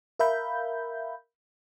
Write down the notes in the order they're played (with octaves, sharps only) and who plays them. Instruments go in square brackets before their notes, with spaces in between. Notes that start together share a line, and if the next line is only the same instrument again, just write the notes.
[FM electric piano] A#4 E5 F5 B5 G6